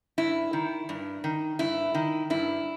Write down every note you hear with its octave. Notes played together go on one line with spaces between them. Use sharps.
G2 E4
D#3
G2
D#3
G2 E4
D#3
G2 E4